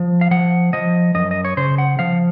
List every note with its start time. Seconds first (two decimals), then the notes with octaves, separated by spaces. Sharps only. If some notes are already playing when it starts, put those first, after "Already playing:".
Already playing: F3
0.21 F5
0.31 F3 F#5
0.73 F3 D#5
1.15 F#2 D#5
1.31 D#5
1.45 C#5
1.57 C#3 C5
1.78 F#5
1.99 F3 F5